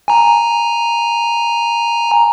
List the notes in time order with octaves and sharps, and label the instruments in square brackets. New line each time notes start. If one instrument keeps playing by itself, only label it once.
[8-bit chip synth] G#5 A#5